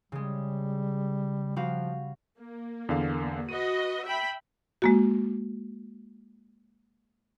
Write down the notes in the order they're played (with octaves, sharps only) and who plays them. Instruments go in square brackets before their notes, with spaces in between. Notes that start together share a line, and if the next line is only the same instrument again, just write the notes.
[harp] C#3 G#3 [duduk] G3
[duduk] F3 [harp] G3 F#4 F5
[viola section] A#3
[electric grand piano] E2 D3 F5
[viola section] F#4 B4 D#5 [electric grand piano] D#7
[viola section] E5 G5 B5
[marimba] G#3 A#3 F#4